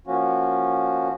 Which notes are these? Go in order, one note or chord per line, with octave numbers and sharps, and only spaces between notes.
F3 A#3 C#4 F#4